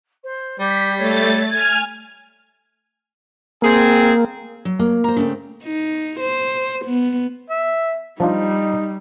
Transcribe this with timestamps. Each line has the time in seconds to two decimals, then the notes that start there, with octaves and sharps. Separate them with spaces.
0.24 C5
0.60 G3 G4 B6
0.98 A3 C#5 A6
1.50 G#5 F6 G#6
3.62 A#3 C4 G#4
4.65 F#3
4.79 A#3
5.04 C5 A#5
5.16 C#3 A3 C4
5.64 D#4
6.20 C5
6.85 B3
7.50 E5
8.20 F3 G3 D4 D#4 F4